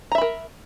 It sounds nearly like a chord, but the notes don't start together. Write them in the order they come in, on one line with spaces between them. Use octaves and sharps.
A#5 E5 B5 A#4